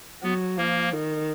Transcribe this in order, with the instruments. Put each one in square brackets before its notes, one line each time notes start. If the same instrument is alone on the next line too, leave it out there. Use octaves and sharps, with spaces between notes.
[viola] F#3 [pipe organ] B3
[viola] F3 [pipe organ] A#3
[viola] D#3